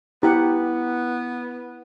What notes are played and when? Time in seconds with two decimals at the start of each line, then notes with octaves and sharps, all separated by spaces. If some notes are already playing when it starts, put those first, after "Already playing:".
0.23 B3 E4 G4 F#5